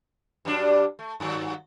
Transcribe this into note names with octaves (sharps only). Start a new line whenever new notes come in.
G2 F#3 D4
A3
G2 D#3 F#3